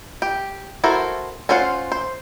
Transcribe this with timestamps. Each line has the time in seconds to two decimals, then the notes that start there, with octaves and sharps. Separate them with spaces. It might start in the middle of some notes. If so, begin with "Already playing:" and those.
0.22 G4
0.84 E4 F#4 A4 A#4 C5
1.49 C#4 F4 C5 F5 F#5
1.92 C5